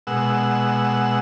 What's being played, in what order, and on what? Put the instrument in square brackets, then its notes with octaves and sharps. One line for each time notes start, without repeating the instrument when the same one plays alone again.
[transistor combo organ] B2 G#3 F#5 E6